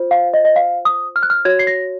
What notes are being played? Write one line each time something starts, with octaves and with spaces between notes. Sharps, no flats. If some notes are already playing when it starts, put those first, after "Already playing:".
Already playing: F4 C5
F5
D#5
D#5
F5
D#6
F6
F#6
F6
F#4 C#5 G#6
C7
A#6